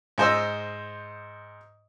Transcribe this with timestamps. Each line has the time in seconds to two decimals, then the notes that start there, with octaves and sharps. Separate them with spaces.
0.18 G#2 C5 D#5 E6